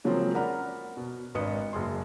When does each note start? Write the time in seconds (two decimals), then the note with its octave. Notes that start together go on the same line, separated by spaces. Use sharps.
0.04 C#3 F3 F#3 G#3 A#3 C4
0.35 A#4 D5 F#5 A#5 B5 F6
0.97 B2
1.35 G#1 D4 B4 D#5 D#6 C#7
1.73 F#1 G#4 C6